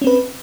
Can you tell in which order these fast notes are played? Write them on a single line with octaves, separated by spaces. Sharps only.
C#4 C4 B4